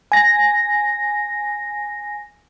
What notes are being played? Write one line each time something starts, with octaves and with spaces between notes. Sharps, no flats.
G#5 A#6